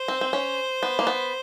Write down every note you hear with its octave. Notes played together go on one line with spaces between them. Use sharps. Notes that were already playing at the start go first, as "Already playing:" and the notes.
Already playing: C5
C4
C4
C#4
B3
A#3
B3